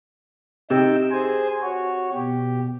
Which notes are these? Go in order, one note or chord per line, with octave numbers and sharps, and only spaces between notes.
C3 D#4 G5 E6
G#4 C5 G#5
F#4 C#5
B2 G4